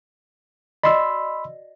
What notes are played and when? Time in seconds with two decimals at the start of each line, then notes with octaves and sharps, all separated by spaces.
0.84 F#4 D5 D#5 B5 C6 E6